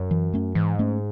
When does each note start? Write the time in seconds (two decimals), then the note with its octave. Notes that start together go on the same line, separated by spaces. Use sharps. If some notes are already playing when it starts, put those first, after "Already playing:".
Already playing: F#2
0.11 E3
0.33 A3 C#4
0.55 G#2 E3
0.79 A3 C#4